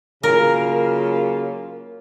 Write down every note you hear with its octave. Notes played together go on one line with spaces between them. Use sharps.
C#3 F#3 A#3 F4 A#4